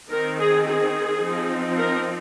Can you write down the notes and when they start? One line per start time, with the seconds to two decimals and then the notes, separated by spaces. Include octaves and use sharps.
0.11 D#3 C4 D#4 A#4
0.38 G#4
0.67 G#4
1.23 F3 C4 D#4
1.78 A#4